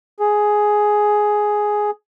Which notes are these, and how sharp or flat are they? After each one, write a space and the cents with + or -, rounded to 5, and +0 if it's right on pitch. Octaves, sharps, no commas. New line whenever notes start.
G#4 +5